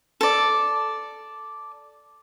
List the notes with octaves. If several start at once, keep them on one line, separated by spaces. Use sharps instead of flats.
A4 D5